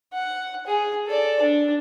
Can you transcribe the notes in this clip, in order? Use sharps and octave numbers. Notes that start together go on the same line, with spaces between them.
F#5
G#4
A4 D5
D4